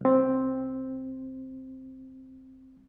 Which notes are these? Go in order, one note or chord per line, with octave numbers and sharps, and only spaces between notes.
C2 C4